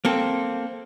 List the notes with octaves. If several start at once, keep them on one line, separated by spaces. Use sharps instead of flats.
A#3 C4 A4